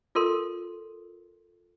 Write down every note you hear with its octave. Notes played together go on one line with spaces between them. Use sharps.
F4 A4 A#4 C6